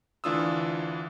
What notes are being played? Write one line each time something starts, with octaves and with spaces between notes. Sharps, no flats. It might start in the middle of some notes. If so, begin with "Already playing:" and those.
D2 E3 D4 F4 D#6 E6